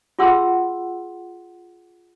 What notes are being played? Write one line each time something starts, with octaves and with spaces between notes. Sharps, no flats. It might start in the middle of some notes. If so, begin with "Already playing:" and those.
F4 G#4 F#5 C6 E6